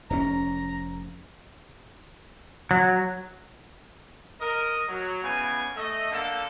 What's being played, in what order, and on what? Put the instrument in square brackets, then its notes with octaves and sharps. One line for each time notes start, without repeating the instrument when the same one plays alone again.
[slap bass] F1 C3 C#4 [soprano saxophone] A#5
[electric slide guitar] F#3
[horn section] A#4 D#5
F#3
C#3 E3 B3 G#5
A3 D#5
D3 A#3 A4